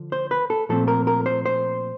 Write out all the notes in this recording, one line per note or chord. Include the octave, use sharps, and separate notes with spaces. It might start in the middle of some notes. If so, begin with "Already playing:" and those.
Already playing: D3 F3
C5
B4
A4
A#2 F3 A3 C4 A4
A#4
A#4
C5
C5